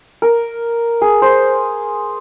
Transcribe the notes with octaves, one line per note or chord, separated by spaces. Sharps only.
A#4
G#4
C5